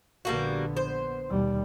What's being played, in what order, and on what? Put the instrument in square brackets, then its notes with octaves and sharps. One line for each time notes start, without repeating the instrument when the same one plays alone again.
[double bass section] A#1 D3 B3 [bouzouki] G3 A#3 F#4
[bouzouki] C5
[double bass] D#2 G3 [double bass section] B2